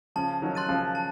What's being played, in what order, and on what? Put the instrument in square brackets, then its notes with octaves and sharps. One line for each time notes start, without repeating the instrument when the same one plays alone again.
[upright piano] C#3 F3 [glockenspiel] A5
[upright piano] D#3 F#3
[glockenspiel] C6 F#6 A6 D#7
[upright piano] C#3 F3
[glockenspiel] A5